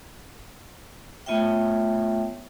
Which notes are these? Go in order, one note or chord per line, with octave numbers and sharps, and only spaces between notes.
A3 B3 F4 C#5 E5 G5